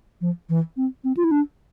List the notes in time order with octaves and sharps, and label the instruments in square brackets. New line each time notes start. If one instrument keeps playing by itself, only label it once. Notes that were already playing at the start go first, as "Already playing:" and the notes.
[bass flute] F3
E3
C4
C4
F4
E4
D4